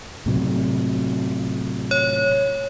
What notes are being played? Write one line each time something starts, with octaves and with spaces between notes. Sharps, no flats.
A2 C3 F#3
C#5